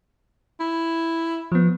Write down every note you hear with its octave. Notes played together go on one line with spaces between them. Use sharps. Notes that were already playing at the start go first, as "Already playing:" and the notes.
E4
F3 B3